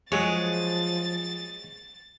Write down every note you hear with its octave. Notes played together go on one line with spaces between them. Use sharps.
F3 F#3 G#3 G#4 C#5 A6